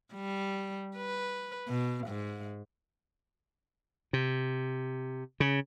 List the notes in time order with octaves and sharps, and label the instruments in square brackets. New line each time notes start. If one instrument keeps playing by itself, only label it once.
[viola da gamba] G3
B4
B2
G#2
[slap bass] C3
C#3